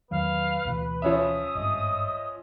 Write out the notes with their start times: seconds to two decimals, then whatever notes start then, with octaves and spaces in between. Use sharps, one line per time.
0.11 E2 D#3 F#3 B4 F5
0.65 D2 B2 E3
1.02 F3 C#4 E5 D#6
1.55 G#1 G2 D#5